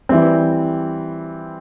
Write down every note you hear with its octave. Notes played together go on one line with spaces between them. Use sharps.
E3 G3 C4